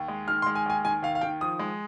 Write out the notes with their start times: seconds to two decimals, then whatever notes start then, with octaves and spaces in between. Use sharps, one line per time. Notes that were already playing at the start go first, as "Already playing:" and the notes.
Already playing: D#2
0.08 G#3
0.28 D#3 F6
0.42 C6
0.46 G#3
0.55 G#5
0.66 D#2 G#5
0.85 D#3 G#5
1.03 D#2 F5
1.15 F5
1.21 D#3 G5
1.41 F3 D#6
1.59 G#3